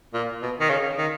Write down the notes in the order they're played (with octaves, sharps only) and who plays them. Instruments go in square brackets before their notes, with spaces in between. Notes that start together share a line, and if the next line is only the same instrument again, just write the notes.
[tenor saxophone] A#2
B2
D#3
C#3
D#3